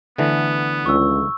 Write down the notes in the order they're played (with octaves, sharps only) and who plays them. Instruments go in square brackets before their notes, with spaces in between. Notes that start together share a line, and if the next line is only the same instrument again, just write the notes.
[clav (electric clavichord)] D3 E3 A3 [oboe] B3
[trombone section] C#2 [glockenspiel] C#6 E6